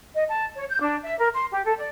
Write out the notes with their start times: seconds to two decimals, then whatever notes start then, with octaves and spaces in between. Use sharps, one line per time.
0.14 D#5
0.28 A5
0.54 C#5
0.69 G6
0.80 D4
1.02 E5
1.19 A#4
1.33 C6
1.51 G4
1.64 A4
1.76 D5